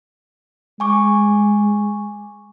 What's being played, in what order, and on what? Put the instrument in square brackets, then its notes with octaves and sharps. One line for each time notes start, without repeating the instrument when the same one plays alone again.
[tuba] G#3 [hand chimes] G#5 C#6 D6